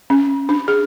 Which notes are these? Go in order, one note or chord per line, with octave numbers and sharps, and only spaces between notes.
C#4
D4
G#4